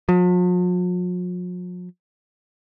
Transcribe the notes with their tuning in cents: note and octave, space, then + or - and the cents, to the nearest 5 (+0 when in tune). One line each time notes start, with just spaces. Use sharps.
F3 +45